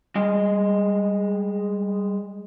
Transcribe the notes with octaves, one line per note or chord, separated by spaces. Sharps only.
G3 G#3 D#5